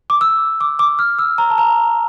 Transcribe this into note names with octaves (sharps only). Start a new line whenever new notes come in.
D6
E6
D6
D6
F6
E6
A#5
A5
A#5